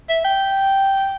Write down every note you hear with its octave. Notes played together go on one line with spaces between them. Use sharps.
E5
G5